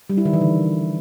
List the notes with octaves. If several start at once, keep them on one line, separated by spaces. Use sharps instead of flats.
G3
E4
D#3
E3
D3